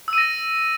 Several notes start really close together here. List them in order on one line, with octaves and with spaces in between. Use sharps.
E6 D#7 A#6